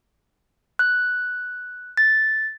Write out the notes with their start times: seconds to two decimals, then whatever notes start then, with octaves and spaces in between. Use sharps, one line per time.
0.79 F#6
1.97 A6